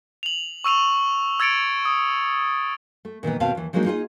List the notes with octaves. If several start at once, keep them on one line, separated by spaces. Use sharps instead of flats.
F7 F#7
C#6 E6 D#7 F7
E6 G#6 A6 C#7 D7 F7
D#6
A3
A#2 D#3 E3 B3
D#2 B2 C4 C5 F5 A5
D#2 E3
F3 F#3 G#3 A#3 D4 D#4
D#4 F4 G#4 C5 D#5